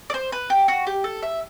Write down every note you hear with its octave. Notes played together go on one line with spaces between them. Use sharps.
D5
C5
B4
G4
F#4
G4
A4
E5